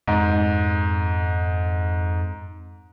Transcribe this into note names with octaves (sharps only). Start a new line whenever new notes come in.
F2 G#2